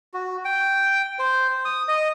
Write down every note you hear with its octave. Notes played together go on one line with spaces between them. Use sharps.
F#4
G5
C5
D#6
D#5